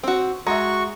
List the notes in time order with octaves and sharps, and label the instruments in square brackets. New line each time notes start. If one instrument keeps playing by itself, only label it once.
[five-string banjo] C4 F#4
[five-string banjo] G#3 [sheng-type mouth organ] F#4 C#6 [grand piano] E5 A#5